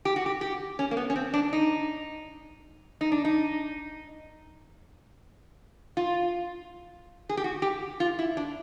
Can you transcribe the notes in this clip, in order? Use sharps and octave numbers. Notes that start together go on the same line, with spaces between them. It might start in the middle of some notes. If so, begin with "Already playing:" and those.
G4
F#4
G4
G4
C#4
A#3
B3
C#4
C4
D4
D#4
D#4
D4
D#4
F4
G#4
G4
F#4
G4
F4
E4
D4